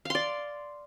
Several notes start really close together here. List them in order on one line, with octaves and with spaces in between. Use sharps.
F5 C6 D5